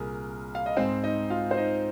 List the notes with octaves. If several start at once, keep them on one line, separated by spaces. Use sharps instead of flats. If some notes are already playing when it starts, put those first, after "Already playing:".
Already playing: C2 A#2 G#4 A#4
F5
D#5
G#2 G#3 C4 C5
D#4 D#5
F4 F5
C5
D#4 D#5